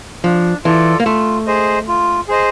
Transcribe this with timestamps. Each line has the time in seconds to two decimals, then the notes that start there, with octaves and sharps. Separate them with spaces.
0.24 F3 D4
0.64 E3 F4 A4 D5
1.00 A#3
1.05 A3 F4
1.47 G#4 C5 D#5
1.88 F4
2.28 G#4 C5 D#5